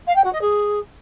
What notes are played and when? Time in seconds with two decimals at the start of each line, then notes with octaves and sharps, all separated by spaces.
0.07 F5
0.16 G5
0.24 F#4
0.33 D#5
0.42 G#4